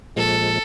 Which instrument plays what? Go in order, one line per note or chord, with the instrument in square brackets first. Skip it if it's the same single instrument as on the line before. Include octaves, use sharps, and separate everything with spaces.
[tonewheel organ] A#2 F3 G#3 [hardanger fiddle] A4